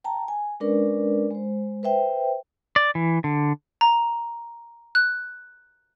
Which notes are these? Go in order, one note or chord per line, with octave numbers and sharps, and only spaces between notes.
G5 A5 A#5
G#5
G#3 C#4 D4 A#4 B4 D5
G#3 C5
B4 C5 E5 G5
D5
E3
D3
A#5
F#6